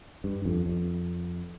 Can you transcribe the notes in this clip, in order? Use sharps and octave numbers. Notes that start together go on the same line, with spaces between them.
G2
F2
F2